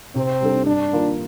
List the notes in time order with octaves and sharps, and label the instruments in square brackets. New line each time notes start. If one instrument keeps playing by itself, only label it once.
[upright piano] C3 [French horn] C4
[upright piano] G3 D4 A4
[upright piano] G2 [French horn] D4
[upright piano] D#3 A#3 F4 A#4